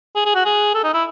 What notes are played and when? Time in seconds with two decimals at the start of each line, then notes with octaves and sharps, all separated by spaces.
0.16 G#4
0.26 G#4
0.35 F#4
0.46 G#4
0.75 A4
0.84 D#4
0.94 E4